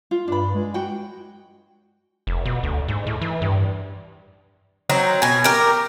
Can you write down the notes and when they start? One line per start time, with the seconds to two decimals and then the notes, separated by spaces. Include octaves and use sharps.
0.11 F4
0.28 G2 D4 B5
0.54 G#3
0.74 F#4 G5
2.27 F1
2.46 B2
2.63 D2
2.88 G#2
3.07 A2
3.22 E3
3.42 G2
4.90 F#3 C4 D#4
5.22 B2 G#5
5.44 G4 A#4